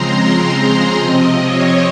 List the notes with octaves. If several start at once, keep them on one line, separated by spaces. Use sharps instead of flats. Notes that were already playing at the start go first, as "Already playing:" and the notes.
Already playing: C#3 F3 G#3 C4 A#5 C6
A#5
C3 F3 C4 D#5
C#5